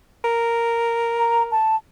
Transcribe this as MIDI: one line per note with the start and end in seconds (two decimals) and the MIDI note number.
0.24 1.56 70
1.19 1.43 82
1.51 1.76 81